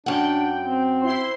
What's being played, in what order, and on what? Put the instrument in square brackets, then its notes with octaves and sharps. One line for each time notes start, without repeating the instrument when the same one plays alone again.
[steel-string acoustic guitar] F#2 F#5 [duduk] D4 [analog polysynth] G5
[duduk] C4
[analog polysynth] E4 C5 C6